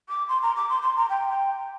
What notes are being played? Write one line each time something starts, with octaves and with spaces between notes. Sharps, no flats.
D6
C6
A#5
D6
C6
C6
A#5
G5
G5